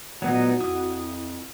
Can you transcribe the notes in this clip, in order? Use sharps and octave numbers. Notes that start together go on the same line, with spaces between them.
A#2 F#3 A3 B3 D#4 F#4 C5
F2 E4 D#6